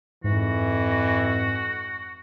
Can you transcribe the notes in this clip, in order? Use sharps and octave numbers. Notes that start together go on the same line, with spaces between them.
F2 G#2 E3 F#4